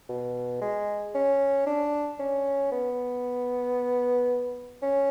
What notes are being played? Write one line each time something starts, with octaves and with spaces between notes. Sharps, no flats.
B2
G#3
C#4
D4
C#4
B3
C#4